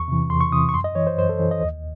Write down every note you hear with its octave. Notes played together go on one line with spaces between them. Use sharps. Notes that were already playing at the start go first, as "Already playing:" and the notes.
Already playing: E2 C#6
C3 E3
E2 C6
C#6
C3 E3 D#6
C#6
F#2 C6
D#5
E3 C#5
C5
F#2 C5
A4
E3
D#5
D#2